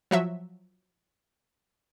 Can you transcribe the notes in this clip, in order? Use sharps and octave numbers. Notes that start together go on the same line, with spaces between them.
F3 F#3 E5